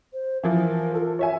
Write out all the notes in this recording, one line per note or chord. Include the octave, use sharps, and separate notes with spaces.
C5
E3 F3 A#4
F4 A4
C#5 E5 G#5